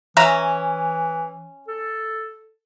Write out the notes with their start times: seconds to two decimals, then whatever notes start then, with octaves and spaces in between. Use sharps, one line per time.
0.17 E3 C#4 E5 A#5
1.68 A4